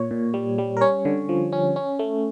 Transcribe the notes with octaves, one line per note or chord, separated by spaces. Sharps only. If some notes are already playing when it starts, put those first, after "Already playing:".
Already playing: A#2 C#5
A#2
G3
G3
A#4
C#4 C#5
D3
F3
C#4
C#4
A3